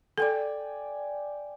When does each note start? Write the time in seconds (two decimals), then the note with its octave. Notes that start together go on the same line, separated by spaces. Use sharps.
0.18 A4 D5 G5 G#5